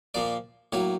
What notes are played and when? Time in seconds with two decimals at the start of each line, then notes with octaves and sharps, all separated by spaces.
0.14 A#2 F3 A#3 D5
0.73 A2 F#3 A#3 C#5